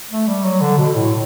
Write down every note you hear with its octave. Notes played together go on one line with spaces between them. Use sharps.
A3
G3
F#3
D3
B2
A2